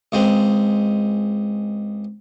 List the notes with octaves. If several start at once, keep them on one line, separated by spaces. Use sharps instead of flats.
C#2 G#3 C4